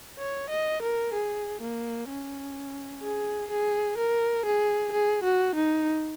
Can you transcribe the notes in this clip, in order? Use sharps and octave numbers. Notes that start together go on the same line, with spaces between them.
C#5
D#5
A#4
G#4
A#3
C#4
G#4
G#4
A#4
G#4
G#4
F#4
D#4